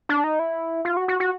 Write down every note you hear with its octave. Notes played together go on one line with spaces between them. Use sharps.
D4
D#4
E4
F4
F#4
F#4
F#4